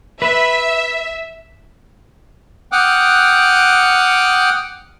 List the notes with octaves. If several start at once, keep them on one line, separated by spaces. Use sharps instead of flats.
B4 E5
F#5 G5 D6 D#6 F6 F#6